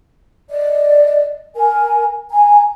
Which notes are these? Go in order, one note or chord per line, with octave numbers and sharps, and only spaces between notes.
D5 D#5
A#4 G#5
G#5 A#5